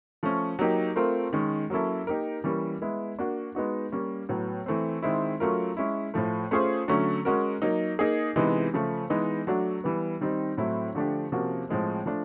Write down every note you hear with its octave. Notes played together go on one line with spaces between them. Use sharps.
F3 A3 C#4
F#3 A#3 D#4 G4
A3 C4 F4 A#4
D#3 G#3 C#4
F#3 A#3 C#4 E4 A4
A#3 D#4 G4 A#4
E3 G3 A#3 C#4
G#3 B3 E4
A#3 D4 F#4
G#3 B3 D#4 F#4
G3 A#3 C#4
A2 F#3 B3
E3 A3 C4
D#3 G#3 C4 E4
F#3 A3 C#4 F4 A#4
G#3 C#4 E4
A2 F3 A3
A3 C#4 F4 G#4 C5
D3 F#3 A3 C#4
G#3 C#4 F#4 A#4
F#3 A#3 D#4
A#3 D#4 G#4
C3 E3 G#3 B3 D#4
C#3 F3 A3
E3 G#3 B3 D#4
F#3 A3 D4 F#4
E3 G3 B3
D#3 G3 C4 D#4
A2 F#3 A3 C4 E4
D3 F3 A3 D4 G4
C3 F3 A#3 C#4 F#4
A2 F3 G#3 C4
F3 A3 D4